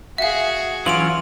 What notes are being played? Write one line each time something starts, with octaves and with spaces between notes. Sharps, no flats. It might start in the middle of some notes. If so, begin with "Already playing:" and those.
F#4 G#4 E5 F5
E3 F#3 C#4 F4 D7 F7 F#7